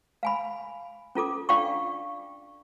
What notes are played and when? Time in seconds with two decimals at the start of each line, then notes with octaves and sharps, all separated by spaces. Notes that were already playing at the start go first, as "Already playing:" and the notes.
0.23 F5 G#5 B5
1.15 C#4 F4 A4 D6
1.49 D4 F4 D5 F5 G5 C#6